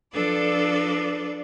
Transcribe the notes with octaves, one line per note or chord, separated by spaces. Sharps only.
F3 D4 A4 B4 D5